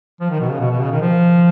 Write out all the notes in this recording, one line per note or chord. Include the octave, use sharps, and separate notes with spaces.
F3
D#3
B2
C#3
B2
B2
C#3
D#3
F3